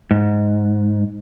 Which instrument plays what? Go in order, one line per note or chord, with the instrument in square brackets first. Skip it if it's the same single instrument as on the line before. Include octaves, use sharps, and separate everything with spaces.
[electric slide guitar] G#2